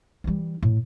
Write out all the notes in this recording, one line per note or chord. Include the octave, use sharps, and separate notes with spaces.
E3 G3
A2